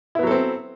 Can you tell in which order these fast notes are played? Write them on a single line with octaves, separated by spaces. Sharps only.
E4 B3 F#3 A4 C4